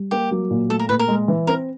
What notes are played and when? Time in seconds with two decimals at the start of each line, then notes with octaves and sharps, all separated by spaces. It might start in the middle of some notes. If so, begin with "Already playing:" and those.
Already playing: G3
0.11 A#3 G4
0.31 F#3
0.50 A#2
0.69 A3 A4
0.79 A#4
0.89 A#2 B4
0.99 A#4
1.08 G#3
1.28 E3
1.47 C4 A#4